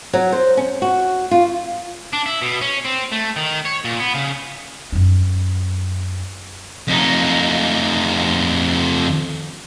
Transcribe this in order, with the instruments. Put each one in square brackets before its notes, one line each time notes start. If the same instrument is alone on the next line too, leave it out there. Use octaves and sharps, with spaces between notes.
[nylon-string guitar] F#3
C5
C#4
F#4
F4
[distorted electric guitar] D4
E4
B2
C#4
C4
A3
D#3
C#5
A#2
B3
C#3
[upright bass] F#2 D#4
[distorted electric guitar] F2 D#4